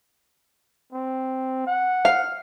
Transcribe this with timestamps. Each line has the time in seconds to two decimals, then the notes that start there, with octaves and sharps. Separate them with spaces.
0.92 C4
1.67 F#5
2.05 F5